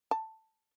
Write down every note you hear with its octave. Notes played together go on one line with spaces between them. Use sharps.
A5